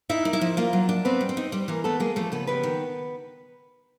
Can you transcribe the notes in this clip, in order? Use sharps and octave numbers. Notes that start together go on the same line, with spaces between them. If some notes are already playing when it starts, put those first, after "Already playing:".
D#4 E4 E5
A#3
E4 E5
F3
A#3 F4 F5
F#3
D4
B3 C4 B4
G3
C4 C5
D#4
G3 C4 C5
E3 A#3 A#4
A3 B3 A4
G#3 A#3 G#4
F3 A3 A4
C#3 B3 B4
G3 B3 B4
D#3